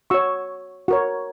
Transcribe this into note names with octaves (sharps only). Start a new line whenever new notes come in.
F#4 C#5 C#6 E6
F#4 A#4 C#5